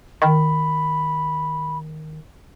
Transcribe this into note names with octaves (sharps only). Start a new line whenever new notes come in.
D#3 B5